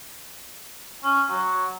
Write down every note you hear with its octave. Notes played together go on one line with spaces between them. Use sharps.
C#4
F#3